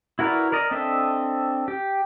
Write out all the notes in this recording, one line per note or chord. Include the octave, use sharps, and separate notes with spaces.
E4 F#4 A#4 B4 D5
A#4 D5 D#5
C4 D4 A4 D#5 E5
G4